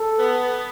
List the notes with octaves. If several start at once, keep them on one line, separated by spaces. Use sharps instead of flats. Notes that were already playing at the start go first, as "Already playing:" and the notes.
Already playing: A4
B3